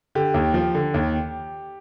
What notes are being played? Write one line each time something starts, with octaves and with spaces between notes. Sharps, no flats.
D3 G4
D#2
F3
D3
D#2